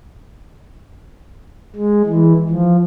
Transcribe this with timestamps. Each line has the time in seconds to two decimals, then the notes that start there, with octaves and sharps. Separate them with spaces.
1.76 G#3
2.06 E3
2.49 F3